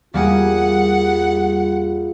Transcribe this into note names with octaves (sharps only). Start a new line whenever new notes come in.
E2 G3 A#3 F4 G#4 F#5